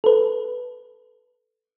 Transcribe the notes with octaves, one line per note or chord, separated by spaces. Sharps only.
A4 B4